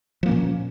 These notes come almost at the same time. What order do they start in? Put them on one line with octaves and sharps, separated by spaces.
F3 A#3 C#4 A#2